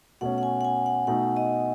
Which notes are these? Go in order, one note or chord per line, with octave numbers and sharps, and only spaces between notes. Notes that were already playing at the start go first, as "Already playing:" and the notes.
B2 A3 C#4 F#5
F#5
G#5
F#5
G#5
F#5
B2 A3 D#4 F#5
D#5